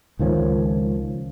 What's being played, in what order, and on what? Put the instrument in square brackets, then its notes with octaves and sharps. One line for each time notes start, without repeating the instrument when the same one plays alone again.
[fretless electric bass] C#2 D#3 F3 C#4